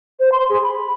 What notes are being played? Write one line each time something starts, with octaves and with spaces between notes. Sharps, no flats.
C5
C6
G#4
B5